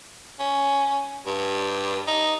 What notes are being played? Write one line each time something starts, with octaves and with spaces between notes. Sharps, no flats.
C#4
G2
D#4